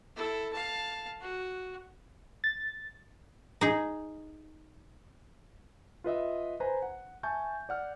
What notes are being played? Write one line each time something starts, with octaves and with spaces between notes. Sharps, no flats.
E4 A4
F5 A5
F#4
A6
D#4 G#4
F4 B4 D#5 E5
B4 C5 G#5 A#5
F#5
E5 G#5 A5 C#6 G6
D5 F#5 F6